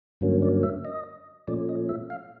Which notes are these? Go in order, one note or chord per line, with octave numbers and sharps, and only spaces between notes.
G2 D3 F#3 A#3 C#4
D5
E5
D#5
A#2 F3 A3 C#4 D5
D#5
E5
F5